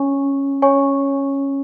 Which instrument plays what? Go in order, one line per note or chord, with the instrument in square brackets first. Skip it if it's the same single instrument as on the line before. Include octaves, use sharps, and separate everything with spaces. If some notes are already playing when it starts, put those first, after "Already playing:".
Already playing: [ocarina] C#4 [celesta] C#5 G#5 C#6
[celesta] C#5 G#5 C#6